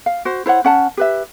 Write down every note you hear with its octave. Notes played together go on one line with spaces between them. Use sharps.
F5
F#4 C5
E4 C5 C#5 F#5
C#4 F#5 A5
G4 B4 E5